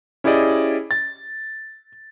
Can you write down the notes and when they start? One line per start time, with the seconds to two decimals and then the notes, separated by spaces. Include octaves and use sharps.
0.24 C#4 E4 G4 G#4 D5 D#5
0.91 A6